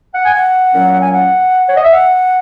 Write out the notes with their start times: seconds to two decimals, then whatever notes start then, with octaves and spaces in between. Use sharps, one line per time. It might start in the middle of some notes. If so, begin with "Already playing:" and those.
0.13 F#5
0.24 G#5
0.34 F#5
0.73 A#2 F#3 C#4
1.01 G#5
1.13 F#5
1.68 C#5
1.75 D#5
1.83 E5
1.92 F#5